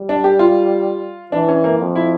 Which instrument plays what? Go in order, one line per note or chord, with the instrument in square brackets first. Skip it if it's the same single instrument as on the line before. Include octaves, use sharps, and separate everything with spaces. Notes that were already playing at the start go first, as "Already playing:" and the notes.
Already playing: [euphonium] G3
[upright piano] D4
G4
F4
[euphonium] E3 [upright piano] D4
[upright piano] C#4
A#3
[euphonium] F2
[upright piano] E4